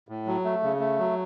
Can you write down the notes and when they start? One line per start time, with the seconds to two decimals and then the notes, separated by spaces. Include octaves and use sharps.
0.09 A2
0.27 F#3
0.44 A3
0.63 C#3
0.79 A3
0.98 F#3